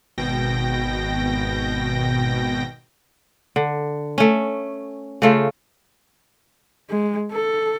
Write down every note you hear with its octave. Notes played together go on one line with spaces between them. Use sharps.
G#1 B2 G5 A#6
D3
A3 C#4
C#3 A3 F4
G#3
A4